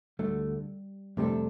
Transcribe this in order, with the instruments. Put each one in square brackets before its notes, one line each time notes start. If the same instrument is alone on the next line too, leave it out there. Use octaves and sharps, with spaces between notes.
[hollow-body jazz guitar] D2 D3 A3 [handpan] G3
[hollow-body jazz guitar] F2 C3 G3 D4 A4 [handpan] A3